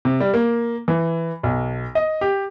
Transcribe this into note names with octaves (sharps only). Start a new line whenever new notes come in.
C3
G3
A#3
E3
B1
D#5
G4